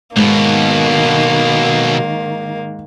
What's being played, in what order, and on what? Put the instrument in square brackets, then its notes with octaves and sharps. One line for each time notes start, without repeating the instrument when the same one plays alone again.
[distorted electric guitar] B1 B2 [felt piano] G#2 [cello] D#3 [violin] A#3